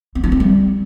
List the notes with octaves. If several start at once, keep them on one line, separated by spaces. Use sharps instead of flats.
C4
D4
C4
G3